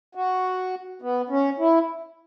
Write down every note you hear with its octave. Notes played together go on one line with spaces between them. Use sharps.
F#4
B3
C#4
E4